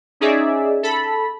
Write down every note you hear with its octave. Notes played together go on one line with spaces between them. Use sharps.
C#4 D#4 G#4 D5 E5
A4 B5